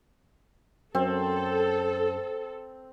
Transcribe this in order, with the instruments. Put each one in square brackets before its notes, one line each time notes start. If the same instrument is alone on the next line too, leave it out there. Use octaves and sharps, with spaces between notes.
[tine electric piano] F#2 F#3 [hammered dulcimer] C4 [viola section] A4